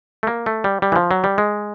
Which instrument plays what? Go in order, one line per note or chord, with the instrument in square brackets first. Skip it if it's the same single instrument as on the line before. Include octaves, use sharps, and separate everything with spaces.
[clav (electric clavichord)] A3
A#3
A3
G3
G3
E3
F3
F#3
G3
G#3